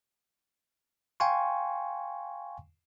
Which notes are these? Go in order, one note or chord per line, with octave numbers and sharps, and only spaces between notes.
F5 G5 G#5 C6 C#6